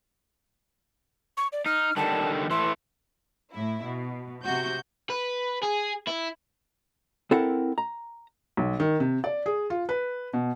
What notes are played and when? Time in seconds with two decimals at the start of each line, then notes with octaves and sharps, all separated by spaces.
1.37 C#6
1.52 D5
1.66 D#4 F6
1.97 D3 D#3 G3 A5
2.51 E3 A3 E4 C6
3.53 A2 E4
3.86 B2
4.43 C3 F#4 G6
5.10 B4
5.62 G#4
6.07 E4
7.31 C4 E4 A4 A#4 F#5
7.78 A#5
8.57 B1
8.80 D#3
9.00 C3
9.24 D5
9.46 G#4
9.70 F4
9.89 B4
10.33 B2